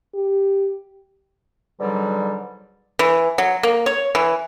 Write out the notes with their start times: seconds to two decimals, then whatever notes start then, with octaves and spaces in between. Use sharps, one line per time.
0.15 G4
1.79 G#2 B2 D3 F#3 G3
2.99 E3
3.38 F#3
3.63 A#3
3.86 C#5
4.15 E3